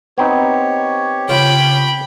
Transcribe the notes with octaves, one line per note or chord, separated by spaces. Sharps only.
B3 C4 D#4 G4 C#5
C#3 F4 G5 B5